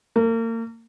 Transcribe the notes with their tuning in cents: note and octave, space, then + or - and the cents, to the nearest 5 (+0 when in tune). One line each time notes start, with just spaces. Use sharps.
A#3 -35